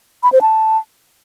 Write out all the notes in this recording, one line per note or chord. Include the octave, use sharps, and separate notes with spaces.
B5
C5
A5